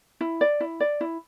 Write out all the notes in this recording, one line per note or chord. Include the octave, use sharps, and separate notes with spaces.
E4
D5
E4
D5
E4